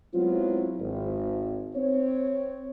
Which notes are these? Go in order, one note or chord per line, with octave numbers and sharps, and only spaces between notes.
F#3 G#3 B3 C4 E4 F4
G#1
C4 C#5